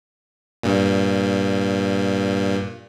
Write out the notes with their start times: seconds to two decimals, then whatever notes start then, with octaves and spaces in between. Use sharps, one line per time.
0.63 G2 A#2